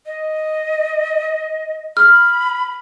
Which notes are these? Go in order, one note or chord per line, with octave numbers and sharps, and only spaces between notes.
D#5
B5 F6